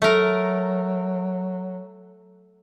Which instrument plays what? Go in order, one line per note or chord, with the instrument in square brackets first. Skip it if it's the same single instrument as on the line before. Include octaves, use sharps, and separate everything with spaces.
[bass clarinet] F#3 [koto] A3 A#4